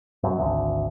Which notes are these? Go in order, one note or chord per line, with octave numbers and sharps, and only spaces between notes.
F#2
G#1 D2